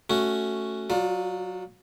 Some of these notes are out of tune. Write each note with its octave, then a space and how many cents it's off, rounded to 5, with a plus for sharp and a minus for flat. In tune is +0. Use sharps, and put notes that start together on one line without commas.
A3 +0 C#4 +0 F#4 +0
F#3 +0 F4 +35 D5 +0